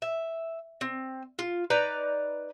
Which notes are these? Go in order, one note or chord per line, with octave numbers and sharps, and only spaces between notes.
E5
C4
F4
D#4 B4 D5 A#5